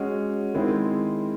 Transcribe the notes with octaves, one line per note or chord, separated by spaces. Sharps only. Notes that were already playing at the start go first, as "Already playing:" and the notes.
Already playing: G#3 C#4 F#4
D#3 G#3 C4 E4